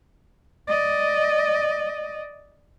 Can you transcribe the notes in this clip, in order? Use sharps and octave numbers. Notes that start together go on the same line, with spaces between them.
D5 D#5